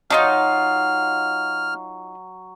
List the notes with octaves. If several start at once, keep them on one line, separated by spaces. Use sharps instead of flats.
F#3 D4 D#4 F4 F6